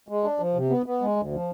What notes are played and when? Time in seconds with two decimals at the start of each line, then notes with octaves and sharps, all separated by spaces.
0.08 G#3
0.24 D4
0.40 F3
0.55 C3
0.70 B3
0.86 B3
1.01 G#3
1.16 D2
1.33 F3